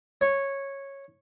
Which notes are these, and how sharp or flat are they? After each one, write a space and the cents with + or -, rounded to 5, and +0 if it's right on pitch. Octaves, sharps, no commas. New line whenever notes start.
C#5 -10